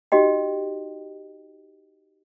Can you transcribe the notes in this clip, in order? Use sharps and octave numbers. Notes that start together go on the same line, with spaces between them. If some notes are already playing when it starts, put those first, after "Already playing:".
D#4 F#4 G4 D#5 G5